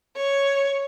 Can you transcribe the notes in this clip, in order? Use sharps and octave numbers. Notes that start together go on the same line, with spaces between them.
C#5